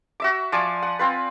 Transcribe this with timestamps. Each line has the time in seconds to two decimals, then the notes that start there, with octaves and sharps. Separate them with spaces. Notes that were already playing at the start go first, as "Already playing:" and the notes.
0.20 F#4 E5 D6
0.52 F3 D5 G#5
0.82 F#5
0.99 C4 F4 B4